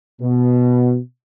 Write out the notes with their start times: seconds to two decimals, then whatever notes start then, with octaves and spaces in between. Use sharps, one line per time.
0.21 B2